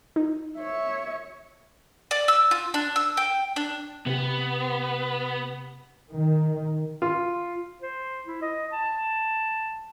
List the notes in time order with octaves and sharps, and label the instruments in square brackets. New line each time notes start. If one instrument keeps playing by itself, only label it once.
[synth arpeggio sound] D#4
[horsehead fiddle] C#5 E5
[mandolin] D5
E6
F4
D4
E6
G5
D4
[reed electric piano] C3 G4 [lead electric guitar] B3
[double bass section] D#3
[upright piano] F4
[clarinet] C5
E4
D#5
A5